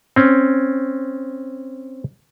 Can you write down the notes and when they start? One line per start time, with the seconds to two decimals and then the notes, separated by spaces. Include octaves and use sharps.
0.16 C4 C#4